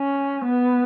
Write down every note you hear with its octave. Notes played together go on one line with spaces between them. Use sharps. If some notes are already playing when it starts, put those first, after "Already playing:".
Already playing: C#4
B3